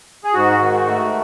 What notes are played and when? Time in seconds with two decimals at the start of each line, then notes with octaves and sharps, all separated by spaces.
0.24 G#4
0.34 G#2 F#4
0.61 D#3
0.87 A3